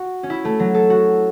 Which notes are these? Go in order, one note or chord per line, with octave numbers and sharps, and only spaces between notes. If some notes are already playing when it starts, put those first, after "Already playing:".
Already playing: F#4
C#4
E4
A3
F#3
A4
F#4